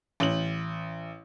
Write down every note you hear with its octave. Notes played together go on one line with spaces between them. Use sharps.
A1 F#7